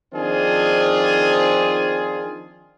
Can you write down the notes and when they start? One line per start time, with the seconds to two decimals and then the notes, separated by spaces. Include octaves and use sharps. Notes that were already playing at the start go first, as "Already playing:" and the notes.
0.13 D#3 F3 C4 D4 F4 G#4